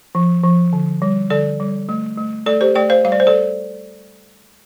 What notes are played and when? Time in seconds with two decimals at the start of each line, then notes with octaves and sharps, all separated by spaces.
0.15 F3
0.43 F3
0.73 D3
1.02 G3
1.30 D3 A4 D5
1.60 G3
1.89 A3
2.17 A3
2.46 A3 A4 D5
2.61 G4 C5
2.75 A3 D5 G5
2.90 C5 F5
3.04 G3 F5
3.12 D5
3.20 C5
3.27 A4 D5